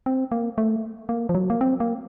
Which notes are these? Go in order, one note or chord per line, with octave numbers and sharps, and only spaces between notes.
C4
A#3
A3
A#3
F3
F#3
A#3
C4
A#3